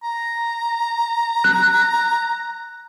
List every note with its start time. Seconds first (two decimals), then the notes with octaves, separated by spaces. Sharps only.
0.03 A#5
1.44 F#6